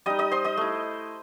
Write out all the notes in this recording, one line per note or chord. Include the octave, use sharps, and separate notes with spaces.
G3 D#4 D#5 D#6
D#5 D#6
C5 C6
D#5 D#6
A3 E4